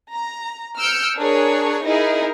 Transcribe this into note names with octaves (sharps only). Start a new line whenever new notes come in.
A#5
E6 F6 G6 C#7 D7
D4 G#4 A#4 C#5
D#4 E4 G#4 A#4